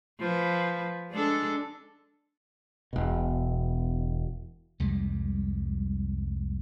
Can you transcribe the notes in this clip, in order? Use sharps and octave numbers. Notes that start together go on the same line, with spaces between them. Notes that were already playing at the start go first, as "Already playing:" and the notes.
F3 B4
G#3 D4 A4
E1 B2
C2 F2 G3 G#3